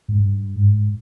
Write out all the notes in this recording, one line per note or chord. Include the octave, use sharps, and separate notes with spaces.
G#2
G2
G#2